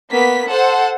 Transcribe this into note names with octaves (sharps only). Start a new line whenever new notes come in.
A#3 B3 B6
A4 C5 F#5